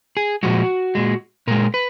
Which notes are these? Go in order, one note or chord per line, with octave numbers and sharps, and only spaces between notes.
G#4
A#2 F3 G#3 F#4
A#2 G#3
A#2 G#3 A#4
B4